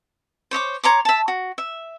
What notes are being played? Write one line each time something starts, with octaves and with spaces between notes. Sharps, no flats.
C5 C#5 D#5 D6
C#5 A#5 C6 D6
E5 A5
F#4
E5